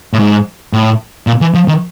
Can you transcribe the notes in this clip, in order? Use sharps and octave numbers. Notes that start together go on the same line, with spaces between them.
A2
G#2
A2
A#2
E3
F3
D#3